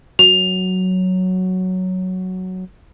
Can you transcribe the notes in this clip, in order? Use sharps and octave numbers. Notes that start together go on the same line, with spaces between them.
F#3 F7